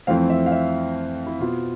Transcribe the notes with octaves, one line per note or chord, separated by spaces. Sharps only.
F2 E3 A3 C4 F5
E5
F5
E5
E4
B2 B3 F4